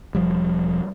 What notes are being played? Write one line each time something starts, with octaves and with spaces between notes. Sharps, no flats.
E1 F3 G3